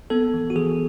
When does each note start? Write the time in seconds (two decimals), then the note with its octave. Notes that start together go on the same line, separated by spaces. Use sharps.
0.10 B3 A4
0.34 E3
0.50 F#4
0.55 E3 G#4